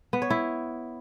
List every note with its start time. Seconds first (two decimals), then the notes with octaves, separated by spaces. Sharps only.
0.13 B3
0.22 C#5
0.30 E4